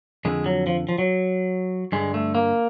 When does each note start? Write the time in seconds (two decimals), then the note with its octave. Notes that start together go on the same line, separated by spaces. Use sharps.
0.25 F2 D3 G#3
0.46 F#3
0.67 F3
0.89 F3
0.98 F#3
1.92 G2 D3 G#3
2.14 A3
2.35 A#3